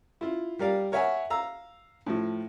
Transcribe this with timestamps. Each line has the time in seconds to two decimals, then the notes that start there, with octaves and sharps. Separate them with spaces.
0.21 E4 F4
0.59 G3 A#4 D5 F5
0.92 A#4 C#5 E5 F#5 G#5
1.30 F5 A#5 E6
2.07 A2 F3